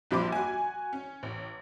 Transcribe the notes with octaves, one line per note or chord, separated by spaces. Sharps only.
A#1 G2 F3 B5 C6 D6
F#4 G#5
C#4
A1